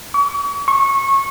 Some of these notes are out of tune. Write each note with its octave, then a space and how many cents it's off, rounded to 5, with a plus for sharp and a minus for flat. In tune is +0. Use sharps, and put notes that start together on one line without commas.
C#6 +45
C#6 -20